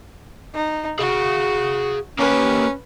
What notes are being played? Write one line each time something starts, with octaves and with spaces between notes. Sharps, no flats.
D#4
F#4 G#4 F5
A#3 C#4 G4 B4